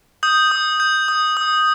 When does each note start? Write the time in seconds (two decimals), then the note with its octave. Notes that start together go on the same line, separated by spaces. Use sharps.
0.23 D#6 G6
0.51 D#6
0.80 G6
1.08 D#6
1.37 D#6